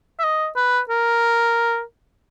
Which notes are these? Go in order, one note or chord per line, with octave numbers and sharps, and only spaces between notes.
E5
D#5
B4
A#4